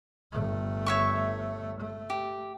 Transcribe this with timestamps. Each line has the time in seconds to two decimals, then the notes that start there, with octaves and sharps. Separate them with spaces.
0.32 G1 A3
0.86 C#5 E5 C#6
1.80 A3
2.10 G4